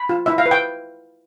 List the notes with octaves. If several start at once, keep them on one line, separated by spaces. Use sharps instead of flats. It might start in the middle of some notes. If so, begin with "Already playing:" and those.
Already playing: B5
F4
E4 E5
F5
B4
G5